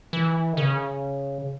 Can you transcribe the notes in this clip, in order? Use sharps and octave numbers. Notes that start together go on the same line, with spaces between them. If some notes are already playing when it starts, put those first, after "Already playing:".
E3
D#3
C#3